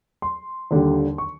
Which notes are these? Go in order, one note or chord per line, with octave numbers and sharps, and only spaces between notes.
C6
D#2 D3 G3
C#6